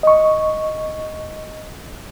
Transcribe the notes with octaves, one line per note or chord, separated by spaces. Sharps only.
D#5 C#6